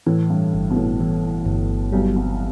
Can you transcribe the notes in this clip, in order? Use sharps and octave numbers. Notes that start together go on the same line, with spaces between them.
A2 E3
G2
G1 G2
B2
A2
E3
G1
B1 B2 G3
C2 C3